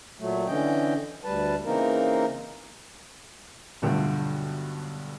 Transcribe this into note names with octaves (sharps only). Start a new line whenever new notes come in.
A#2 F#3 A3
D3 E3 C#4 D#5 G5
D2 G3 B4 A5
C#3 E3 A#3 C4 D#4 A#4
B1 G2 D3 A3 F4 G5